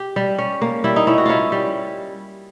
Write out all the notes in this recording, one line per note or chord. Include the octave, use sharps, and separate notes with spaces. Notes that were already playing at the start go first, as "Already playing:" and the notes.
Already playing: G4
G3
C#4
A#3
G3 E4
D#4
C#4 E4
F#4
C#4 E4 F4
G3